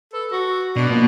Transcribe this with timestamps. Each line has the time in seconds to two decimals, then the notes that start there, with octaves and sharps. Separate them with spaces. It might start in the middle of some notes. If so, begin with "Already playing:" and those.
0.13 A4 B4
0.32 F#4 A#6
0.76 B2 D4 D6
0.90 F3 A#3